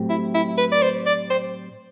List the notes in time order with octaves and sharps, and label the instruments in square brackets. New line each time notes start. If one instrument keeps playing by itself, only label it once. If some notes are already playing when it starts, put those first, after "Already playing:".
Already playing: [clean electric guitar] A2 F#3 A3 C4 G4
[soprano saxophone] E4
E4
B4
D5
C5
D5
C5